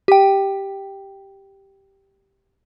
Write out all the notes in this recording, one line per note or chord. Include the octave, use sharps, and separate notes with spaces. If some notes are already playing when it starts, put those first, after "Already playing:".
G4 G5